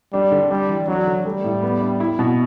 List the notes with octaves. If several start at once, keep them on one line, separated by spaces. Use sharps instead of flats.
G3 D4
D3
G3 D4
E3
F#3 D4
D3
G3 A3
A2
B3
D4
E4
B2